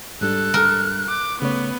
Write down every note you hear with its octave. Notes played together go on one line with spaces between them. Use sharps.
G#2 G3 D4 A4 F#6
A#4
D6
C#3 A3 B3 C#5